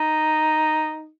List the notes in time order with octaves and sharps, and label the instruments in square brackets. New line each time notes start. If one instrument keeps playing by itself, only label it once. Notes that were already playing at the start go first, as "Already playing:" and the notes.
Already playing: [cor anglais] D#4